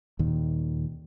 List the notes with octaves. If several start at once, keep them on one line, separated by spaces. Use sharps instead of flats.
D#2 A#2 D#3